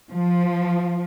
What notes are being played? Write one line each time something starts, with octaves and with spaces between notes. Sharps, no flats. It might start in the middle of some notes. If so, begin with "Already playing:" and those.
F3